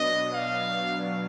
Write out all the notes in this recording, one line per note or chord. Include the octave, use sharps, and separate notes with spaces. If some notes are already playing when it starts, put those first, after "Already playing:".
Already playing: B2 F#3 B3 D4 D#5
F5